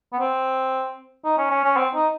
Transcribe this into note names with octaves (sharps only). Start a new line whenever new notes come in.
B3
C4
D#4
C#4
C#4
C#4
C4
D#4